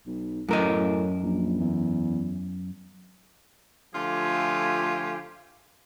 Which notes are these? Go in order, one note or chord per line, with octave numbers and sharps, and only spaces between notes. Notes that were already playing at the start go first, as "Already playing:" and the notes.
B1
F#2 A2 A#4 D#5
A#1
E2
D3 F3 A3 F4 G4 G#5